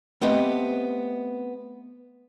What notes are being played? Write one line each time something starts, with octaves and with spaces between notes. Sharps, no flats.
A3 B3 C4 G4 B4 D#5